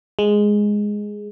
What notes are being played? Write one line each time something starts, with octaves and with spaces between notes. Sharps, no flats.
G#3